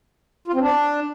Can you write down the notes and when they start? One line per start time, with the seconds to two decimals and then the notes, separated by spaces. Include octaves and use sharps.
0.48 F4
0.54 C4
0.61 D4